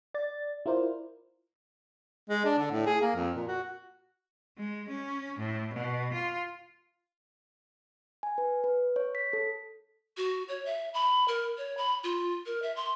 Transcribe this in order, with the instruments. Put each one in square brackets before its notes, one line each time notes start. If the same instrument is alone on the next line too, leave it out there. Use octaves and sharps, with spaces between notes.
[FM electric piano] D5 A6
E4 F4 A#4 C5 D5
[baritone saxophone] G#3
D4
D3
A2
G#4
A#3
F2
A#2
F#4
[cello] G#3
C#4
A2
B2
F4
[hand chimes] G#5
B4
B4
C#5
B6
A4
[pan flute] F#4
C#5
E5
B5
A#4
C#5
B5
F4
A#4
E5
C6